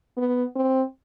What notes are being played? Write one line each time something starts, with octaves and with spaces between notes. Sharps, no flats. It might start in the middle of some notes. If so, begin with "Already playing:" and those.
B3
C4